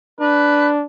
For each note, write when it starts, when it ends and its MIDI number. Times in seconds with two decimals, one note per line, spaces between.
0.20 0.84 62
0.20 0.69 71